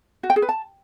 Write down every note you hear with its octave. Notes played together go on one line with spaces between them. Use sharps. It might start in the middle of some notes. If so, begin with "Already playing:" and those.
F#4
G5
G#4
B4
A5